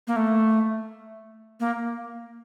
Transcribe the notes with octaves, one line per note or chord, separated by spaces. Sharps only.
A#3
A3
A#3